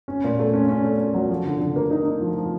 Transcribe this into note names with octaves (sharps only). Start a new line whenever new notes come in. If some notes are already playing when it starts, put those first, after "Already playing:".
C#4
A#2
A3
C#4
C#4
A3
A3
F#3
F3
D3
D3
A#3
D#4
D#4
F3
F3